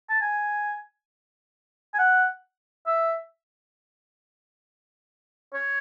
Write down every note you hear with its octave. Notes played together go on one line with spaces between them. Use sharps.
A5
G#5
G#5
F#5
E5
C#5